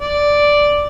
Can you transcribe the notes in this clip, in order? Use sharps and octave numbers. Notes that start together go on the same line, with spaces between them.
D5